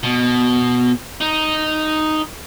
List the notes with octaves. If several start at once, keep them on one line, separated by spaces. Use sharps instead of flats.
B2
D#4